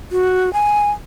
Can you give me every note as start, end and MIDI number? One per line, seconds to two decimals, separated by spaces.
0.12 0.52 66
0.53 0.90 80